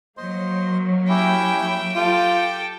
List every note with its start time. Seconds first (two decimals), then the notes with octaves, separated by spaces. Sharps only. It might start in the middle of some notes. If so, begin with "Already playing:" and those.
0.17 F#3 A#3 C5 D#5 C6
1.09 C#4 E4 G4 E5 G5
1.96 F4 G4 A4 G5